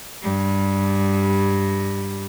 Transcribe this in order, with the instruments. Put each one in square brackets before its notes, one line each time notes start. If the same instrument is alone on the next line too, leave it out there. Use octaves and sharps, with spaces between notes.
[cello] G2 G3